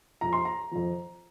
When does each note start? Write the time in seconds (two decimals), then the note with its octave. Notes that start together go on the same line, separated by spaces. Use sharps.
0.21 F2 F3 A#5
0.33 C6
0.45 A#5
0.71 F2 F3